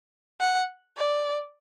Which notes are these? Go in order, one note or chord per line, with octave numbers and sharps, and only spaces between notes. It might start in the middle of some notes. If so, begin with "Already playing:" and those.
F#5
D5